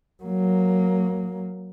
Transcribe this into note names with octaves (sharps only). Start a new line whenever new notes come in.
F#3 A#3